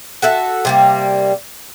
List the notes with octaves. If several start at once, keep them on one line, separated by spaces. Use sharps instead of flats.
F#4 A4 E5
C3 G3 A#3